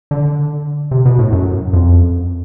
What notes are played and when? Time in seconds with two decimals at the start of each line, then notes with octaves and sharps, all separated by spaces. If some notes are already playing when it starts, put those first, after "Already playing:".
0.11 D3
0.91 C3
1.05 B2
1.19 A2
1.32 F#2
1.73 F2